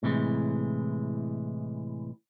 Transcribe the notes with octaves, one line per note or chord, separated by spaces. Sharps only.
A2 C3 E3 G3 G#3